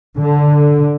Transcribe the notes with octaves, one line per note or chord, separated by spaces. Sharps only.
D3